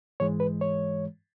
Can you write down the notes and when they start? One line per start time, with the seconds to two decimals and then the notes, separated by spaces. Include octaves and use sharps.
0.20 G#2 E3 G#3 C#5
0.40 B4
0.61 C#5